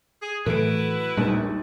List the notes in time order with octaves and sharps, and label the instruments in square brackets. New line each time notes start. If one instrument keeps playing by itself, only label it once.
[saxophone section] G#4
[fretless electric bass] A2 E3 F#3 [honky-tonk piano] A3 D7 [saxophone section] E4 F#4 B4
[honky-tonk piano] A#1 D#2 [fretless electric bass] G3 G#3 A#3